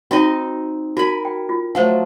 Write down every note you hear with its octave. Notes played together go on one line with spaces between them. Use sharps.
C4 D#4 F#4 D#5 G5
F#4 A#4 G#5 B5
G5
F4
F3 F#3 A3 C5 F#5